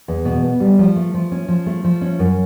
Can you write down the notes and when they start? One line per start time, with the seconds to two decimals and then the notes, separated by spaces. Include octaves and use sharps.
0.08 E2
0.25 B2
0.43 B3
0.60 G3
0.79 F3
0.96 A3
1.14 F3
1.32 C#4
1.48 F3
1.66 A3
1.84 F3
2.01 C#4
2.19 F#2